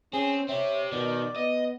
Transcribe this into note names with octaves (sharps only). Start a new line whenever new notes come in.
C4 C#4 G#4
C4 G4 C#5 E5
B2 D#3 D5
B3 D#5